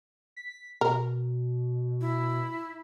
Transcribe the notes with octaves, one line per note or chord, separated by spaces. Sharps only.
B6
B2 A#4
E4